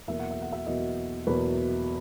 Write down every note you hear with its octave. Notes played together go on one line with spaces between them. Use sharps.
E2 B2 F#3 A#3 E5
F#5
E5
F#5
E5
E2 B2 F#3 A#3 D#5
E2 B2 F#3 A#3 B4